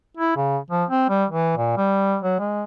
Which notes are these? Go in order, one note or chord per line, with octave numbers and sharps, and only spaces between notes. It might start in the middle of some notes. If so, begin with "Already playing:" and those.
E4
C#3
F3
C4
G3
E3
A#2
G3
F#3
G#3